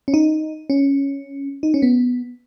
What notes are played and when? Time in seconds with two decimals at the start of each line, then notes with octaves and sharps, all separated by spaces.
0.08 C#4
0.14 D#4
0.70 C#4
1.63 D#4
1.74 C#4
1.82 B3